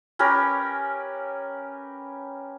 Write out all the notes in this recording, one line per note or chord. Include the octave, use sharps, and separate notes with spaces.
C#4 G4 A#4 B4